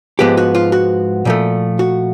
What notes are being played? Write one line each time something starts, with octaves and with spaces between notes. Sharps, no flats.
G#2 F3 G#3 B3 G4
F#4
F4
F#4
A#2 F3 A3
F#4